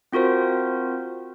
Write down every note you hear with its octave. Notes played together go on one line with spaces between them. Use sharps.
C4 F4 F#4 A#4 C5